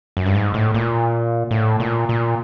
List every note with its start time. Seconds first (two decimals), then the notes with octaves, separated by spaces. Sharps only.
0.17 F#2
0.26 G2
0.35 G#2
0.54 A2
0.74 A#2
1.51 A2
1.80 A#2
2.09 A#2